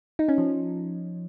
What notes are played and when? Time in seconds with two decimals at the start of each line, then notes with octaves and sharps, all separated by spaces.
0.19 D#4
0.29 C#4
0.38 F3